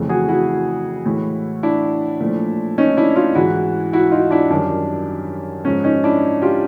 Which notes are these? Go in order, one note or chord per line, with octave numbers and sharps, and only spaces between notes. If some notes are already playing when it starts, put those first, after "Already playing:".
Already playing: F2 C#3 E3 A3
F#4 G#4
E4 F#4
A2 E3 G#3
D4 E4
A#2 F3 A3
C#4 D#4
D4 E4
D#4 F4
G#2 E3 G#3 E4 F#4
E4 F#4
D#4 F4
D4 E4
F#2 D#3 G3 D4
G#2 F3 G#3 C#4
C#4 D#4
D4 E4
F4 G4